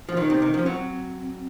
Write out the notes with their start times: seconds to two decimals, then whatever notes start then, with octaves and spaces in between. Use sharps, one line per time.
0.09 F3
0.17 D#3 D#4
0.30 C3
0.42 D#3
0.54 F3 C#4
0.66 F#3 C4